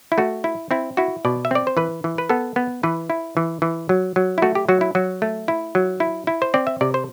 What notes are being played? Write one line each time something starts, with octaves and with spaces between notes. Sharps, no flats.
E4
A3 F#4
E4
C4 E4
E4 F#4
B2 D5
E5
C4 D5
C5
E3 B4
E3
B4
B3 A4
B3
E3 B4
E4
E3
E3
F#3
F#3
E4
A3 F#4
G4
F#3 F#4
E4
F#3 F#4
A3
E4
F#3
E4
E4
C5
C4 D5
E5
C3 D5
C5